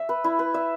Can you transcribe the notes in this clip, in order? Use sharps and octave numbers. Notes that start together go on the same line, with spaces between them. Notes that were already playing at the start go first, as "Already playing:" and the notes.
Already playing: E5
B4
E4
B4
E5